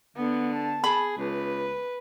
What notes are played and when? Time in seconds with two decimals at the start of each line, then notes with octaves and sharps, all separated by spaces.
0.17 D3 B3
0.54 A5
0.84 G#4 B5
1.17 C#2 B4